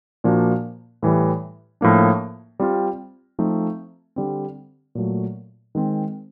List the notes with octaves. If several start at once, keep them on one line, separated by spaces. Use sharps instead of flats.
A#2 F3 A#3 D4 F#4
A2 E3 G3
A2 F3 A#3 D4
G3 C4 F4
F3 A3 C4 D#4
D3 G3 C4
A#2 F#3 A3
D#3 G#3 C4